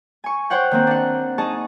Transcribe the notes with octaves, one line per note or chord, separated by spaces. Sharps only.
G#5 C#6
C5 C#5 F#5 G5
D#3 A#3 C4
D4 F#5
D#4 G#4 D#5 A5 C#6